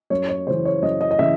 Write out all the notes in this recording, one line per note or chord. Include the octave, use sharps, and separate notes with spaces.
F#2 C#5
C#5
C#3 E3 C5
C#5
F#2 D#5
D#5
D#5
C#3 E3 E5